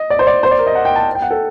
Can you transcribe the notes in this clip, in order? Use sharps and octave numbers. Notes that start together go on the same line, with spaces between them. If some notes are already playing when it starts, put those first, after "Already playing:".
Already playing: D#5
D5
C5
D5
C5
D5
A#4
D#5
F#5
G5
A5
G5
F#5
A4